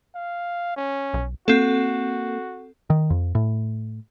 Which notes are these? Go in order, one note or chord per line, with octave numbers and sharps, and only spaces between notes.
F5
C#4
B1
A#3 C4 F#4 A4
D#3
F2
A2